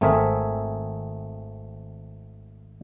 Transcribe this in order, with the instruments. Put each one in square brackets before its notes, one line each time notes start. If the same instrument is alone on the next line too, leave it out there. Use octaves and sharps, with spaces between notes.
[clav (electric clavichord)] G#1 A3 C4 G#4 A#4 E5